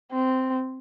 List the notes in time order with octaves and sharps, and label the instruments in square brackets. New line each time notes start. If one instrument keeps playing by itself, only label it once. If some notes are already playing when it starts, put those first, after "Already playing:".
[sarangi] C4